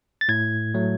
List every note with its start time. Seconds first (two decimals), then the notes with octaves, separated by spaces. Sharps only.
0.21 A6
0.29 A2 G#6
0.74 F#3 A3